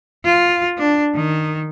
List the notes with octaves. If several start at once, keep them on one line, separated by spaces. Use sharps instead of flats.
F4
D4
D#3